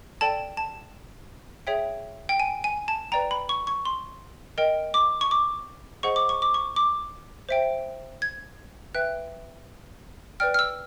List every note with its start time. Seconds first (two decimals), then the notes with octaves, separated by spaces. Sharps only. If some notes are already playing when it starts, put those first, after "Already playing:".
0.21 A4 D5 G5 A5
0.57 A5
1.67 G#4 C#5 E5 G5
2.29 G5
2.40 G#5
2.64 G#5
2.88 A5
3.12 B4 D5 G5 A#5
3.31 B5
3.49 C#6
3.67 C#6
3.85 C6
4.58 A#4 D#5 G5
4.94 D6
5.21 C#6
5.31 D6
6.03 G#4 C5 D#5 F#5 C#6
6.16 D6
6.29 C#6
6.42 D6
6.54 C#6
6.76 D6
7.49 C5 E5 G5
8.22 G#6
8.95 B4 E5 G5 F#6
10.40 B4 D5 G5 F6
10.54 F6
10.59 E6